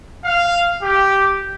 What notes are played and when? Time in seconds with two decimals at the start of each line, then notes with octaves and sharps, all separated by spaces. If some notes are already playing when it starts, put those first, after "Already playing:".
0.25 F5
0.82 G4